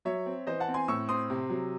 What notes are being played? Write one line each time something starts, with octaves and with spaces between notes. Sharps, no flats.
F#3 C#5 E5
C4
E3 C5 D#5
F#5 A5
C4
G#5 C6
A2 C#6 E6
C4 C6 D#6
C3
F#3